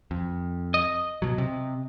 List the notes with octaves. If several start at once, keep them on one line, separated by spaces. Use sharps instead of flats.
F2
D#5
B2 F#3
C3